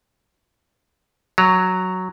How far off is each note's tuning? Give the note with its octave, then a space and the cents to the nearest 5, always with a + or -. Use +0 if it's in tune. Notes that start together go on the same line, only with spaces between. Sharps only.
F#3 +0 A#5 +0